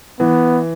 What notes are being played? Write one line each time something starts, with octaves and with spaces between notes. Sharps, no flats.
E3 B3